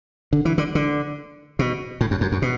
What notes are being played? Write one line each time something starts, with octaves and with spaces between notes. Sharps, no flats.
D3
E3
D3
D3
B2
A2
F#2
F#2
F#2
B2